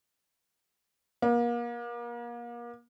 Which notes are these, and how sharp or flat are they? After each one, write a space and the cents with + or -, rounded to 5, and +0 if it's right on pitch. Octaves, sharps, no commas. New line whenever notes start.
A#3 +35